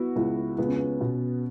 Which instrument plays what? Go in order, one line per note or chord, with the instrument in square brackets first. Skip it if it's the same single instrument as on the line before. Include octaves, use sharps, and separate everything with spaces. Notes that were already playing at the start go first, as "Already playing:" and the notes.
Already playing: [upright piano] B3 [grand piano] E4 F#4
[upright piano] C#2 [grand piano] E4
[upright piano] C#2 [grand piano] B3
[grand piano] C#4
B3
[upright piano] B2